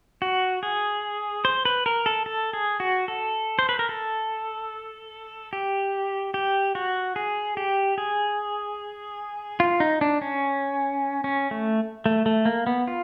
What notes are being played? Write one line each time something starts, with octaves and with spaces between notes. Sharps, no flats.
F#4
G#4
C5
B4
A#4
A4
A4
G#4
F#4
A4
C5
B4
A#4
A4
G4
G4
F#4
G#4
G4
G#4
F4
D#4
D4
C#4
C#4
A3
A3
A3
A#3
B3
F4